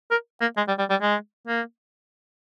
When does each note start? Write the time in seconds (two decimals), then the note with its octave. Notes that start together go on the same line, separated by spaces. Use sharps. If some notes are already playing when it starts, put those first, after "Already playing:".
0.11 A#4
0.41 A#3
0.57 G#3
0.68 G3
0.79 G3
0.90 G3
1.02 G#3
1.48 A#3